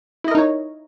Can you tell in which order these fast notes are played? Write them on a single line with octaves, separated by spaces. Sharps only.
E4 D#5 A#4 D#4 C#5